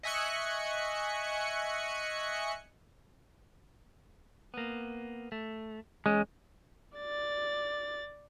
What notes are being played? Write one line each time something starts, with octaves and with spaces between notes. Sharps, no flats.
D#5 E5 G#5 C#6 F#6 C#7
A#3 B3
A3
E2 G#3 C#4
D5 A6